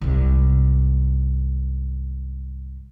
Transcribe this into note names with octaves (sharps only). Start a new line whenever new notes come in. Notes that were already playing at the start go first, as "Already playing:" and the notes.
C2 G#2